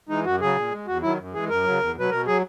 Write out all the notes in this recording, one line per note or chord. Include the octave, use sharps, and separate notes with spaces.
E3 G#3 D#4
F#2 F#4
C#3 F#3 G#4
A#2
G#3
E2 F#4
D#3 F#3 E4
F#2
E3 G#3 G#4
F#2 A#4
C#3 F#3
E2
B2 F#3 B4
B2 A#4
F#3 G#4